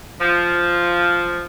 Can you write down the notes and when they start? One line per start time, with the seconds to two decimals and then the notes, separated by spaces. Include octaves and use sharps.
0.20 F3